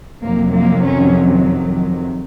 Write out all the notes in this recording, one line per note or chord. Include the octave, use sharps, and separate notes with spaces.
F2 C3 D#3 F#3 A#3
A#3
C#4